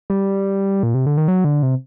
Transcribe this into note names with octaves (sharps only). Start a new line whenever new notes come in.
G3
A#2
C3
D3
D#3
F#3
D3
C3